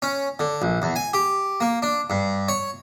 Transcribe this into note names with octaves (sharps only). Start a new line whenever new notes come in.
C#4
D3
A#1
E2
G#5
G4
A#3
D4
G2
C#5